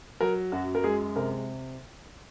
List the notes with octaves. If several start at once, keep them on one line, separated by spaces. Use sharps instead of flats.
F#3 A#4
F#2 F#4
A#4
G#3 G#4
C3 A#4